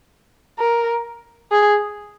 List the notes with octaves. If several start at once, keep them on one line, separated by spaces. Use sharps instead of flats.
A#4
G#4